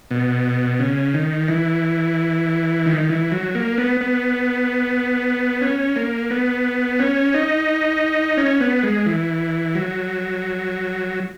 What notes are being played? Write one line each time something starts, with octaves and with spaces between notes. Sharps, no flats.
B2
C#3
D#3
E3
D#3
E3
F#3
A#3
B3
B3
C#4
A#3
B3
C#4
D#4
C#4
B3
G#3
E3
F#3